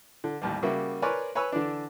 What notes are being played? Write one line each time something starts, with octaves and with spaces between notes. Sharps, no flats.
D3
A1 D#2 G3
C#3 G3 A#3 F#4 E5
A#4 B4 C#5 D5 G#5 C6
B4 C#5 G#5 B5 E6
D3 E3 D4